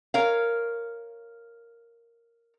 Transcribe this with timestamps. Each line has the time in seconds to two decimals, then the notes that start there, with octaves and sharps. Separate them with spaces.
0.14 A#4 C#5 F5